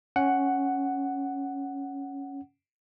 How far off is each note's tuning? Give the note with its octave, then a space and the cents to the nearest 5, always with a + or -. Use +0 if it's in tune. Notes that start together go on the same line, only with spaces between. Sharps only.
C#4 +0 F#5 +5